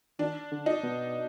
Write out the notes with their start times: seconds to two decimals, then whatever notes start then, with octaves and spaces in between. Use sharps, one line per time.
0.19 D#3 D4
0.51 D3
0.66 D#4
0.83 B2